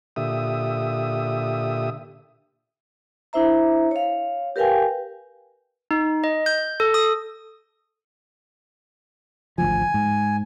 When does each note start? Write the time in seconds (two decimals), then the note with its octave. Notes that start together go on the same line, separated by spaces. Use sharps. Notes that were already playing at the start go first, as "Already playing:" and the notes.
0.16 A#2 D3 G4 E5 D#6
3.33 D4 E4 C5 E5 A#5
3.91 C#5 F5
4.56 G4 A#4 B4 F5 G5 G#5
5.91 D#4
6.24 D#5
6.46 G6
6.80 A4
6.94 D#6
9.58 G#1 D2 F3 G#5
9.94 G#2